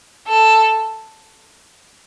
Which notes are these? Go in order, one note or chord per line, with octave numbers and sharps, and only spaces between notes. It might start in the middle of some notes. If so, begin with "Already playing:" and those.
A4